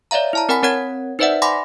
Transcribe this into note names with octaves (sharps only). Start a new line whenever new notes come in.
C#5 D5 E5 F5 A#5
E4 A5 A#5
C4 A#4 F#5 G#5 B5 B6
C4 A#4 C#5 F#5 G#6
D#4 B4 C5 D5 E5 F#5
F#5 G#5 B5 C6 D6 A#6